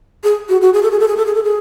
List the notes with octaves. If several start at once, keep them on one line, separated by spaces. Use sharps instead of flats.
G#4
F#4
F#4
G#4
A4
G#4
A4
G#4
A4
G#4
A4
G#4